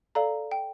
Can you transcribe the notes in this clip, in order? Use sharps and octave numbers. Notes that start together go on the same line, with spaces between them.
A4 D5 F5 A#5
G5